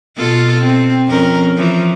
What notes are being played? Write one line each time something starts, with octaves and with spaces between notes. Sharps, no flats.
B2 F4 A4
C4
F2 C#4 A#4
E3 F3